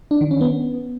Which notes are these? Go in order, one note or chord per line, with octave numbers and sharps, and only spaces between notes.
D4
D#3
C#4
B3